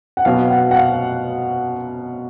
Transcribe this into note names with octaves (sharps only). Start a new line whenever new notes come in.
F#5
B2 F#3 B3 F5
F#5
F#5
F5